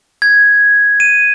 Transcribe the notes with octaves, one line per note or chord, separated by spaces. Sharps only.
G#6
D#7